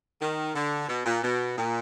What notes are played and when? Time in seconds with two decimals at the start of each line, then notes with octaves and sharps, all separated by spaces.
0.21 D#3
0.55 D3
0.88 B2
1.06 A#2
1.23 B2
1.58 A#2